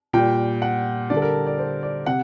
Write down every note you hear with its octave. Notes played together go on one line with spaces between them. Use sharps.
A#2 G3 G5
F#5
D3 G3 D5
A4
A#4
D5
C5
D5
C3 F#5